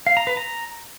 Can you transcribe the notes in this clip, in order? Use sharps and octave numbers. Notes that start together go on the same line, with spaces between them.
F5
A#5
B4
A#5